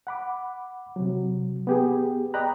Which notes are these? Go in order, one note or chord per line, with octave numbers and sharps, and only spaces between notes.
F#5 B5 D6
C3 F#3
B3 G4 G#4
D5 D#5 G5 A#5 B5 F#6